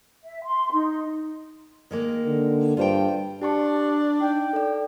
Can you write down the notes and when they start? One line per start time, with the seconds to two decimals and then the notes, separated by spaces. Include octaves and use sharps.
0.25 E5
0.45 C6
0.73 D#4
1.91 D#3 G#3 A#3
2.26 D3
2.77 G2 F4 C5 G5
3.42 D4 G4 A5 C#6
4.21 D#4 G5
4.53 A4 D5